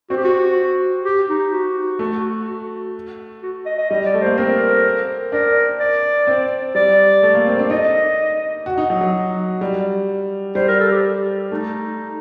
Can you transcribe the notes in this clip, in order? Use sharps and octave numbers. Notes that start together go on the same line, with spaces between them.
C4 F#4
G4
F#4
G4
D#4
F#4
A3
F#4
D#5
D#5
G3 D#5
D5
A3
A#3 C5
C4 A#4
D4 A#4
D5
C4
G3 D5
A3
A#3
C4
D4
D#4 D#5
F#4
D#4
F#3
F#3
G3
G3 C5
A#4
A4
G4
A3 D#4